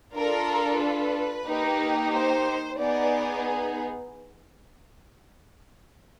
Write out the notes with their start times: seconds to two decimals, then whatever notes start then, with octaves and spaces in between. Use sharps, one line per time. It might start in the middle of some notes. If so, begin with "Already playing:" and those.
0.14 D4 F4 A4 A#4
0.81 B4
1.47 A#3 D#4 G4
2.13 C5
2.78 B3 D#4 G#4 D5